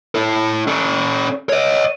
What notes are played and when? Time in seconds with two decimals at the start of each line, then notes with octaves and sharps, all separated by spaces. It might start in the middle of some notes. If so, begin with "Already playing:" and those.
0.15 E4 A4
0.67 C#4 A4
1.49 C#5 D#5